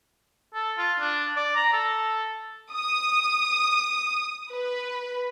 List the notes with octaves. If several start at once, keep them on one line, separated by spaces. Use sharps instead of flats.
A4
F4
D4
D5
A#5
A4
D#6
B4